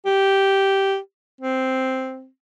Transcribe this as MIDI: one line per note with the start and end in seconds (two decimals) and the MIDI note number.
0.05 0.98 67
1.41 2.28 60